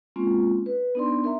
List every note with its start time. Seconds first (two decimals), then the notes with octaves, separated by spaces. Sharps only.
0.16 G#3 A#3 C4 C#4 F4
0.66 B4
0.95 B3 D4 D#4 D5 C6
1.24 A#4 E5 A#5